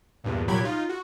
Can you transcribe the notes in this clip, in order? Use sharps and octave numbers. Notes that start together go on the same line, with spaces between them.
E2 G2 A#2
C2 A#2 F#3 G4 B5 G#6
D#4 F4
F#4